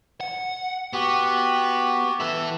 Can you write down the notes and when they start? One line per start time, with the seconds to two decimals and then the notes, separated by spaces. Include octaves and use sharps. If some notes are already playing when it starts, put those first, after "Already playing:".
0.21 F#5
0.93 B3 F#4 G4
2.20 E4 A4 B4